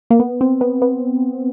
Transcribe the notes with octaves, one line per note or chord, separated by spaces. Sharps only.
A#3
B3
C4
B3
B3